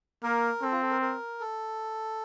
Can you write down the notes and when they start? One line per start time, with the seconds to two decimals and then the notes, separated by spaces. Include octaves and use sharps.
0.23 A#3 A#4
0.62 C4 A4
0.72 F4
0.82 A4
0.91 A#4
1.02 A#4
1.40 A4